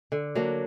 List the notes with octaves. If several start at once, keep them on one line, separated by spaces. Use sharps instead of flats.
D3
F#3 A#3 D4